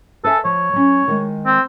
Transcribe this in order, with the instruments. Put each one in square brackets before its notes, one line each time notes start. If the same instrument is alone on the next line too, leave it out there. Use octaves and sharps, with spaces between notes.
[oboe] A4 [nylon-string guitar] B4 E5 G#5
[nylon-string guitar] F3 [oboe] C#5
[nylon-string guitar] F#3 C#4
D#3 G#3
[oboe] C4